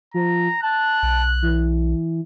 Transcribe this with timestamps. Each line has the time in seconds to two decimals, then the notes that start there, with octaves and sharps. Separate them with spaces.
0.14 F3 A#5
0.63 A5 F#6
1.03 B1
1.42 E3